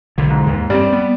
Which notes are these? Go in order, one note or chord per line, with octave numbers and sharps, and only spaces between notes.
B1 D3
G#2
D#2
G2 G3 C4 D5
B3